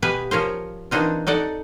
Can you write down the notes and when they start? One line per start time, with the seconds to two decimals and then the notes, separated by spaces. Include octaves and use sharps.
0.02 B2 B3 G4 B4 F5 G#5
0.31 F3 C#4 A#4 C5
0.91 E3 A#3 C4 D4 D#4 F4
1.27 D#4 A4 D5 F#5